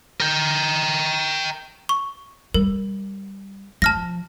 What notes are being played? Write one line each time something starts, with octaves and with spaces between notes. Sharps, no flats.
A#4 G5
C#6
G3 A#4
F3 A5 F6 A#6